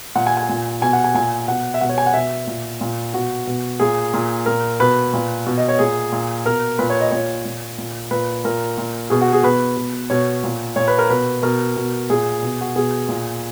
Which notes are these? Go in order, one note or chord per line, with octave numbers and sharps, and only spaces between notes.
A#2 F#5
G#5
G#5
A#2
B2 G#5
F#5
G#5
A#2 G#5
B2 F#5
E5
B2 F#5
C#5
G#5
F#5
B2 E5
A#2
A#2
B2 F#4
B2
A#2 G#4
A#2
A#2 A#4
B2 B4
A#2
B2
D#5
C#5
A#2 G#4
A#2
B2 A#4
A#2 B4
C#5
D#5
A#2 C#5
A#2
A#2
A#2 B4
A#2 A#4
A#2
B2 G#4
F#4
G#4
B2 B4
B2
B2 C#5
A#2
A#2 C#5
B4
A#4
B2 B4
B2 A#4
B2
A#2 G#4
B2
F#4
B2 G#4
A#2